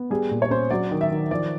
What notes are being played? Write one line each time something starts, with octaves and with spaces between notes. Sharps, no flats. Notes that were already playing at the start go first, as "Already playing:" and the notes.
Already playing: B3
G3 G#4
A#2
C#5
C#4 C5
F#3 D5
D#3
E5
D#3
F3 D5